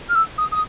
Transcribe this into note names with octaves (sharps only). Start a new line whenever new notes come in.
F6
E6
D#6
D#6